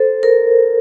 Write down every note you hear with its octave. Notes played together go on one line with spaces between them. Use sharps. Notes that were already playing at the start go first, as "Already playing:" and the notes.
Already playing: A4 C5
A#4